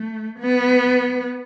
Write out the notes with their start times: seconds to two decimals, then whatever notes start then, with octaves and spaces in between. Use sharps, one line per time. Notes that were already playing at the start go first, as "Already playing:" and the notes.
Already playing: A3
0.39 B3